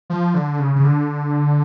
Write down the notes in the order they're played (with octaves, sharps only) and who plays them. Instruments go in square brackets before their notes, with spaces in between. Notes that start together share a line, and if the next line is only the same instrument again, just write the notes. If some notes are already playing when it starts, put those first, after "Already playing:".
[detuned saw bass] F3
D3
C#3
C#3
D3